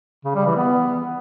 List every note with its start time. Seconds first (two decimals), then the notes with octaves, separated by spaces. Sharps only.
0.25 C#3
0.35 G3
0.46 E3
0.57 B3